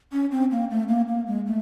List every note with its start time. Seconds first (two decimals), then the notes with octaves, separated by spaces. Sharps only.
0.12 C#4
0.31 C4
0.51 A#3
0.70 A3
0.88 A#3
1.08 A#3
1.27 G#3
1.46 A3